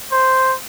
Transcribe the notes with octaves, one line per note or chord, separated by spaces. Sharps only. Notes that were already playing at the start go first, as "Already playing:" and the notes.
C5